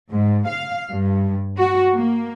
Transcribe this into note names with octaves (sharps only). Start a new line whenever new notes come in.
G#2
F5
G2
F#4
A#3